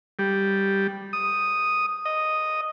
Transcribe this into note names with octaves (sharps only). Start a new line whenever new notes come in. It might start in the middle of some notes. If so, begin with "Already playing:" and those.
G3
D#6
D#5